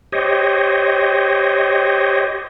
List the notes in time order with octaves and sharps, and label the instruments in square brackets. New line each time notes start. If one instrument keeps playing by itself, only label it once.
[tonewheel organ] G4 C5 C#5 D#5